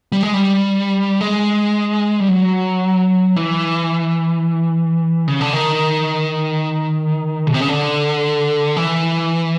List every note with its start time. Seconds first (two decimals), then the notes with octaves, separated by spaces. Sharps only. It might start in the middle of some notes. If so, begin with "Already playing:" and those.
0.12 G3
0.23 G#3
0.34 G3
1.21 G#3
2.20 G3
2.29 F#3
3.36 E3
5.28 C#3
5.41 D3
5.53 D#3
7.47 B2
7.54 C3
7.61 C#3
7.68 D3
8.77 E3